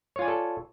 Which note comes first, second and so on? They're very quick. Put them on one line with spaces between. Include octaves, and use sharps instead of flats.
C#5 F4 G#5 D5 A4